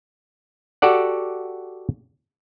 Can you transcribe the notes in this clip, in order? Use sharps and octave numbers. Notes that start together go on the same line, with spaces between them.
F#4 G4 A4 D5 F#5